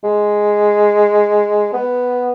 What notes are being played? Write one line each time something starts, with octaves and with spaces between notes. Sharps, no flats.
G#3
B3